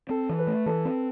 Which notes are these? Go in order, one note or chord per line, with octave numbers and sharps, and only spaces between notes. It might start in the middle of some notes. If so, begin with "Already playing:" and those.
C4 A4
E3
B4
A3
E3 A4
C4